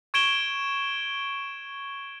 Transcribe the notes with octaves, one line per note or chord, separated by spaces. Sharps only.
C#6 G#6 D7 E7 G7